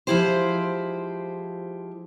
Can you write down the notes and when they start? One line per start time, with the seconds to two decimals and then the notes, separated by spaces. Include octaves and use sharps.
0.07 F3 G#3 E4 G4 C5